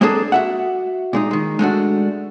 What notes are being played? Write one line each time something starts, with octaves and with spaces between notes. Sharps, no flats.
G#3 A#3 C4 D4 G#4 A4
F#4 E5 F#5
A#2 G#3 D#4
D#3 G#3
G#3 A3 D4 F#4